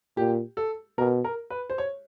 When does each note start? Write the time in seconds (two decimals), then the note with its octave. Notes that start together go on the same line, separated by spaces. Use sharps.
0.17 A#2 G4
0.57 A4
0.97 B2 A#4
1.24 A#4
1.50 B4
1.70 C5
1.78 C#5